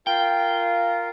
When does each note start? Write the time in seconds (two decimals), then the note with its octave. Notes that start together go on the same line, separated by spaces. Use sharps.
0.07 F4 A#4 G5